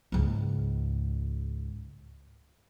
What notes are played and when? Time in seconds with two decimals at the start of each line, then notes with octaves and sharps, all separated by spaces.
0.12 C#2 G#2